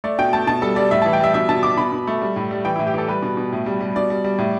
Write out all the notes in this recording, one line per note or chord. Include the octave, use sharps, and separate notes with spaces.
A3 D5
B2 G5
A3 A5
B2 A5
G3 A4
G3 D5
A2 E5
E3 A5
G5
G3 E5
B2 E5
B2 A5
B2 D6
B2 B5
B2
A3
G3
A2
G3
E3 G5
A2 E4
G4
E3 A4
G3 B4
B2
B2
A2
G3
G3
B2 D5
G3
G3
A2